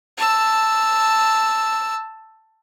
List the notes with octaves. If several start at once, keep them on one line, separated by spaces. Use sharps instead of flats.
A5 E6